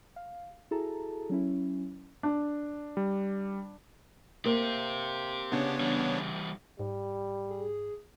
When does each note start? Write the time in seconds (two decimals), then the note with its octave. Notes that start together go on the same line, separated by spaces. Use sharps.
0.16 F5
0.71 E4 F#4 G#4 A4 A5 A#5
1.29 F#3 C#4 E4
2.23 D4
2.97 G3
4.45 A#3 G4 C5
5.52 C#3 B3 D4 C#5
5.80 E3 G3
6.79 G#2 G3
7.50 G#4